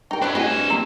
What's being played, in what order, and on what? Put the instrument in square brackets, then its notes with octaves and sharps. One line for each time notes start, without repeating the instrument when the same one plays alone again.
[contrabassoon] G2 [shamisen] D#4 A#4 [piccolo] G5
[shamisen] E3 F#3 C5 [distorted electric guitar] D4 B5 [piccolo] F#6
[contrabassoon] A2 [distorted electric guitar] C4 G#5 [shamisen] F#4 G#4 D#5
[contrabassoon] G2 [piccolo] E7
[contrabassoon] A#1 [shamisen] C4 C#4 A#5